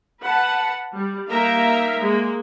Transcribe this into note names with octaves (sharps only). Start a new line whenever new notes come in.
B4 F#5 A5
G3
A#3 D#4 A#4 E5 F5 A#5
G#3 A#3